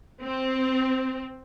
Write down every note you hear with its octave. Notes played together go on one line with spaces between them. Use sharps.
C4